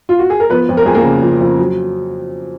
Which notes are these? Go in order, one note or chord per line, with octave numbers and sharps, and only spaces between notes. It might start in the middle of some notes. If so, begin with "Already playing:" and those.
F4
F#4
G#4
A#4
F3 B3 B4
F2
A#4
F2 G#4
A#3 A#4
C#3
F3
F2
F#3